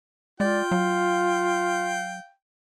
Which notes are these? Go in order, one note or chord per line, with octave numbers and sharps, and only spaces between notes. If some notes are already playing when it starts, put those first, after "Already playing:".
G#3 F4 D5 G5
F#3 F5